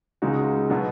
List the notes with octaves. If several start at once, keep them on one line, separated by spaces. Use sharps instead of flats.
C#2 C#3 G#3 D#4 F#4
B2 F#3 B3